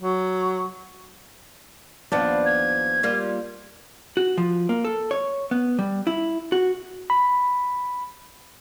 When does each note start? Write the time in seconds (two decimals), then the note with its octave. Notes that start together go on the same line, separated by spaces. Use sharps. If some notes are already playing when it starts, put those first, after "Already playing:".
0.01 F#3
2.12 D#2 F3 B3 D4
2.46 G#6
3.03 G3 A#3 F4
4.17 F#4
4.38 F3
4.69 A#3
4.85 A4
5.11 C#5
5.51 B3
5.79 G3
6.07 E4
6.52 F#4
7.10 B5